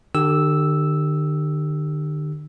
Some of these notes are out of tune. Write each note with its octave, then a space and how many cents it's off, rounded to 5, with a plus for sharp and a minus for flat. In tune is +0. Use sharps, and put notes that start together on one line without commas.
D3 +45 G4 +0 E6 -5